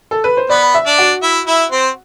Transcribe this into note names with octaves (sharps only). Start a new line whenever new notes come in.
A4
B4
C5
B3 B4 D5
E5
D4 D5
F#4
E4 E5
E4 E5
C4 C5